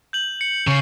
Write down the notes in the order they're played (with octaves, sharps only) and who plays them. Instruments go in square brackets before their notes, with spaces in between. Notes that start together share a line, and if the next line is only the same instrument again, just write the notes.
[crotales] G6 F#7
C#7
[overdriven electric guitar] C#3 [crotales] C#6 C7